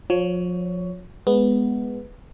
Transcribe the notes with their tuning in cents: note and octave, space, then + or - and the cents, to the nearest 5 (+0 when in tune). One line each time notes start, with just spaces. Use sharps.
F3 +35 C#5 +15
G#3 +0 B3 +0